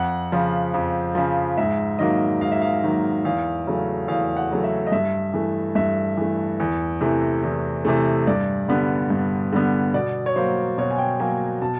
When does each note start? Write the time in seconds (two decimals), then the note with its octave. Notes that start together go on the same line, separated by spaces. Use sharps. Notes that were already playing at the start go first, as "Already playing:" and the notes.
Already playing: F2 F#5
0.32 C#3 F3
0.74 F2
1.15 C#3 F3
1.57 G#2 E5
1.99 D#3 F#3 A#3 D#5
2.41 G#2 F5
2.52 E5
2.62 F5
2.83 D#3 F#3 A#3
3.25 E2 F5
3.67 C#3 F#3 A3
4.08 E2 F5
4.37 F#5
4.50 C#3 F#3 A3
4.64 E5
4.87 D#5
4.92 G2 E5
5.34 E3 A3
5.75 G2 E5
6.17 E3 A3
6.60 E2
7.01 C3 E3 A3
7.43 E2
7.85 C3 E3 A3
8.27 G2 D5
8.68 D3 G3 B3
9.10 G2
9.53 D3 G3 B3
9.94 B2 D5
10.26 C#5
10.36 F#3 A#3 C5
10.78 B2 C#5
10.91 G#5
10.98 G5
11.20 F#3 A#3 G#5
11.62 B2 A5